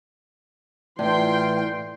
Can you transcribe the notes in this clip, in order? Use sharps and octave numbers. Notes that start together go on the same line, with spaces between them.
A2 E3 F4 D5 G5 C6